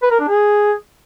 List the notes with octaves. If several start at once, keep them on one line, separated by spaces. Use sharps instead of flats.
B4
A#4
D4
G#4